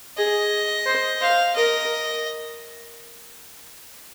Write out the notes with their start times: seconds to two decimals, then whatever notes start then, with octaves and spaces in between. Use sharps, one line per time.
0.18 G#4 D#5
0.86 C5
1.21 C5 F5
1.55 A#4 D#5